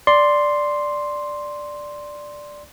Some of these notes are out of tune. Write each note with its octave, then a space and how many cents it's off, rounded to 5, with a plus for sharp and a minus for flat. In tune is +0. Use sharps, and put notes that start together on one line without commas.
D5 +0 C6 +0